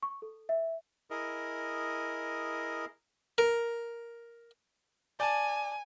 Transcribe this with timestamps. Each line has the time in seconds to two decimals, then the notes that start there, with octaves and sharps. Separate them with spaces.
0.03 C#6
0.22 A4
0.49 E5
1.10 E4 G#4 A#4 D#5
3.38 A#4
5.20 D5 G#5 A5